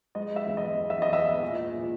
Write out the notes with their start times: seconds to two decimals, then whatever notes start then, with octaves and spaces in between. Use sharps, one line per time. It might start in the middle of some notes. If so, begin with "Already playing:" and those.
0.15 G#3 D#5
0.36 E5
0.46 E2
0.57 D#5
0.79 E2
0.90 E5
1.02 D#5
1.11 E2 E5
1.42 A#2
1.74 A#2